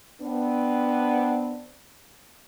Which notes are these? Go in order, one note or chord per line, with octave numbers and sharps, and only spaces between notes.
B3 C4 D4